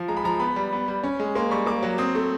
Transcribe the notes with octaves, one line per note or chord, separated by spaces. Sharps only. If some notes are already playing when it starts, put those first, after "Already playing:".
Already playing: F3
G#3 A#5
B5
F3 A#5
B3 B5
G3
B3
G3
C#4
G#3
A#3 C6
G3 C#6
A#3 D6
F#3
C4 D#6
A3